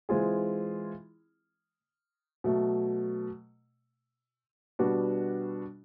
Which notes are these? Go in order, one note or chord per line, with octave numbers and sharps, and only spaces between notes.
E3 G#3 C4 F4 G#4
B2 F#3 A3
B2 G3 B3 D4 F#4